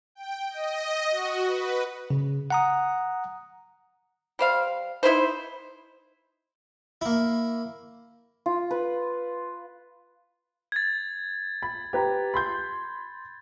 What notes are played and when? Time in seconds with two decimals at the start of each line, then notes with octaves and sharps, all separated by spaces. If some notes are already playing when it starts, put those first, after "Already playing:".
0.15 G5
0.49 D#5
1.11 F#4
1.46 B4
2.10 C#3
2.50 F#5 A#5 D#6
4.39 G3 C5 F5
5.03 D#4 E4 B4 C5
7.01 A#3 E4
8.46 F4
8.71 B4
10.72 G#6 A6
11.63 B5
11.93 G4 B4 A#5
12.34 B5 C6 G6